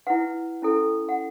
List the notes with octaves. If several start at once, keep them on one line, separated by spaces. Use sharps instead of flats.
E4 B4 F#5
C#4 E4 A4
F#5